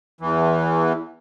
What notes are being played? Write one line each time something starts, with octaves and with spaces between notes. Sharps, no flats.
E2 E3